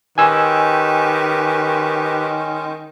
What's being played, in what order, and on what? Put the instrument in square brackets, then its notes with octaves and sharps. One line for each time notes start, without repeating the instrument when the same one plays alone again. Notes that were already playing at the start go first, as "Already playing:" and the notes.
[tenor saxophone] D#3 [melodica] G#3 C#4 [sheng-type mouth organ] G4 B4 [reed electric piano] G#5 E6